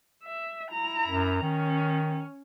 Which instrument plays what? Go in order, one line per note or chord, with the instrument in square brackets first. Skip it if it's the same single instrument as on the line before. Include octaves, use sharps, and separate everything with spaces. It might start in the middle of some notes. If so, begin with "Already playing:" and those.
[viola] E5
E4 A#5
[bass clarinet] F#2
[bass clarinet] D#3 [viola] C#4